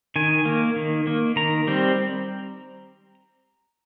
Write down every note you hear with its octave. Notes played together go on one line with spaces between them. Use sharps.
D#3 G#5
A#3
D#3
A#3
D#3 A#5
G3 C4